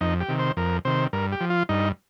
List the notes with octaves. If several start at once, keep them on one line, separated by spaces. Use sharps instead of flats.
F2 D#4
G4
C3 D#3
C5
F2 A#4
C3 D#3 C5
G2 A#4
G4
F3
F4
G2 D#4